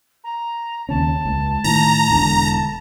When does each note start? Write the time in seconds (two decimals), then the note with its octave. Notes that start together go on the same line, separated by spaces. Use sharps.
0.24 A#5
0.89 D#2 C#3 C#4 A5
1.25 C#2
1.64 A2 D#3 A#5
2.11 E1 D3
2.43 A5